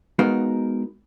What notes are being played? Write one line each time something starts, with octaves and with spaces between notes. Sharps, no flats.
G#3 B3 D#4 F#4 A#4 F5